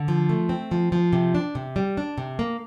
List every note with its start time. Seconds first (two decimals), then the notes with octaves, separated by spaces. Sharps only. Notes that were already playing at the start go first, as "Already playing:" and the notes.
Already playing: D3
0.08 F3
0.29 A3
0.49 C4
0.71 F3
0.92 F3
1.13 C3
1.35 D4
1.55 C3
1.76 G3
1.97 D4
2.18 C3
2.39 A#3